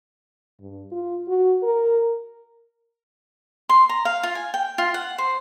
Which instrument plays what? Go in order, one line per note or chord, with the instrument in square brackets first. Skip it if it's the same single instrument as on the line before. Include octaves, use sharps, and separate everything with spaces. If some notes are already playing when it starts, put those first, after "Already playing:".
[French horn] G2
F4
F#4
A#4
[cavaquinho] C6
A#5
F5
F4
G#5
G5
F4
F#5
C5